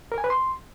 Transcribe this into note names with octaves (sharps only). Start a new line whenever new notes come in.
A#4
G#5
B4
C6